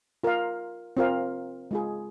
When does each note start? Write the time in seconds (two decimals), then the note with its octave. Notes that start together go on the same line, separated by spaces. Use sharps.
0.24 F4 A#4 F5
0.97 C4 F4 A#4 F5
1.71 G#3 F4 G#4